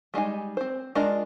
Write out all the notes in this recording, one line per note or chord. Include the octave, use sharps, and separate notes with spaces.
G3 G#3 D#4 G#5
C4 C5
G#3 D4 F4 A#4 D#5